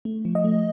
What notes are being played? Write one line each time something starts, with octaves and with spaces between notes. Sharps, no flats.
A3
F3
D#5
A3